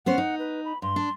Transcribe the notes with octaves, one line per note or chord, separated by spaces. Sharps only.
B3 C#4 C5 F#5
D#4
B4
B5
G2 C6
D4